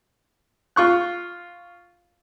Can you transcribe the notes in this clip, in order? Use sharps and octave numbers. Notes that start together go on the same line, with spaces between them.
F4 C#6 F#6